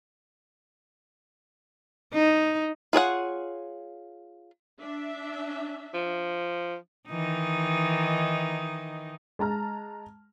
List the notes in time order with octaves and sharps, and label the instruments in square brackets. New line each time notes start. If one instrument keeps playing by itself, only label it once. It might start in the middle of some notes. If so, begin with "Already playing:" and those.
[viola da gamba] D#4
[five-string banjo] F4 G#4 C#5 F#5
[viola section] D4 E5
[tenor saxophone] F3
[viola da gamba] D#3 E3 D#4
[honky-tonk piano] G#3 A5 A#5 F6